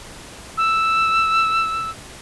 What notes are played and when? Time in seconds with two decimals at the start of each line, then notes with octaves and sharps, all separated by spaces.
0.58 E6